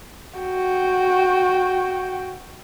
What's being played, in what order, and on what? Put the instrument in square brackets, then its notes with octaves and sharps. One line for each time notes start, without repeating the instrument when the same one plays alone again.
[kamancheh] F#4 G5